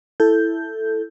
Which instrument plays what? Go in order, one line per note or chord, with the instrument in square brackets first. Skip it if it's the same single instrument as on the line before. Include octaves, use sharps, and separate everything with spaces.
[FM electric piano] E4 A4 G6